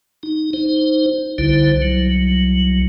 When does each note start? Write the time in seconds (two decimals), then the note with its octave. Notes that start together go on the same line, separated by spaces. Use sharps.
0.23 D#4
0.53 D#4 C5
1.38 C2 D3 E4 C5
1.82 F#3